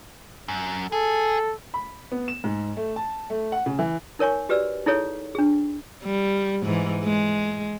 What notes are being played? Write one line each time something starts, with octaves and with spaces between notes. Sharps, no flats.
F#2
G#4 A4
B5
B3
E7
G#2
A3
A5
A3
F#5
C#3
E3
D#4 A#4 C#5 G#5 C#6
F#4 G4 B4 D5 E6
D#4 E4 G#4 A4 C#5
D4 G#4
G3
G#2 E3
G#3